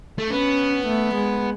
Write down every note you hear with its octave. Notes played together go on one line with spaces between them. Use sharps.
A3
B3 C#4
A3
G#3